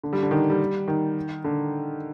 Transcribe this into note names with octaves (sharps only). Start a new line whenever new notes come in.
D3
G3
D3
D#3
G3
D#3
D3